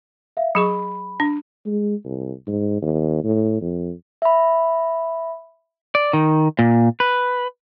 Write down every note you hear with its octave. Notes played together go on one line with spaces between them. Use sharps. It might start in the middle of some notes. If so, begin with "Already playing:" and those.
E5 F5
F#3 G#4 B5 C#6
D4
G#3
C2
G#2
D#2
A2
F2
E5 B5
D5
D#3
A#2
B4